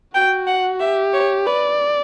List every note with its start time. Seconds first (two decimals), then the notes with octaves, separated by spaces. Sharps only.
0.15 F#4 G5
0.47 F#5
0.80 G4 E5
1.13 C#5
1.46 B4 D5